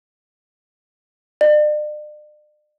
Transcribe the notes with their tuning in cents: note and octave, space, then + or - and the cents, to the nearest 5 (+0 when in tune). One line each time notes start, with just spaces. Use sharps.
D5 +40